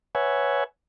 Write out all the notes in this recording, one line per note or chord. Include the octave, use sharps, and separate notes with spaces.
B4 C#5 E5 F#5 G#5